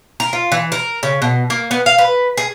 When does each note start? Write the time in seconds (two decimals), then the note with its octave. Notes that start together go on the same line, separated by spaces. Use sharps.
0.20 A#4
0.33 F4
0.52 E3
0.72 A#4
1.03 C#3
1.22 B2
1.50 A#3
1.71 B3
1.86 F5
1.98 B4
2.37 G#4